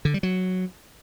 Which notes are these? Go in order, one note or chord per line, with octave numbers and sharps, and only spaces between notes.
D3
G3
F#3